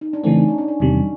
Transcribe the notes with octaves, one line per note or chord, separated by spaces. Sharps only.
D#4
D4
C#3 E3 A3 C4 C#4
D#4
D4
C#4
D4
E2 C3 D#3 G3